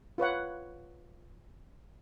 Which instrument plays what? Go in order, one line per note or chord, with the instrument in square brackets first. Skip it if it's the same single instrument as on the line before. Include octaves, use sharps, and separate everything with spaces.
[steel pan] F4 B4 C#5 F#5